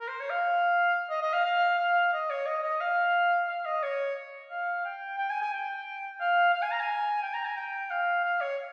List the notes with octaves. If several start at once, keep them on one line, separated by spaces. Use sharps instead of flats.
A#4
C5
C#5
F5
D#5
D#5
F5
F5
F5
D#5
C#5
D#5
D#5
F5
F5
D#5
C#5
F5
G5
G5
G#5
G#5
G5
F5
F5
G#5
A#5
G#5
G5
A#5
G#5
G5
F5
F5
C#5